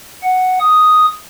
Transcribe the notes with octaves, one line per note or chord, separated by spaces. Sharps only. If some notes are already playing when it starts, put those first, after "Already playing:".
F#5
D#6